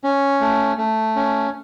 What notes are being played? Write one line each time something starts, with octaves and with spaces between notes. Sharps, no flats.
C#4
A3
A3
C#4